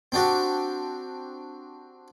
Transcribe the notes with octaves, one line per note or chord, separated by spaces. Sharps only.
C4 D4 F#4 G4